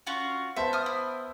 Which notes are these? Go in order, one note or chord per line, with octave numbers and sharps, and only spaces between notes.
C#4 F4 F#4
B3 C5 E5 A5
D#6 F6
E4